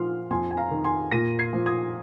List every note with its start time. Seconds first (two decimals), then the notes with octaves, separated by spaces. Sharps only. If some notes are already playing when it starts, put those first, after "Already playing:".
Already playing: A#2 F3 C6 F6
0.31 F2 G#5 C6
0.51 G#5
0.57 F5 A#5
0.71 D#3
0.84 G#5 C6
1.11 A#2 A#6 D#7
1.39 G#6 C7
1.53 F3
1.66 D#6 G#6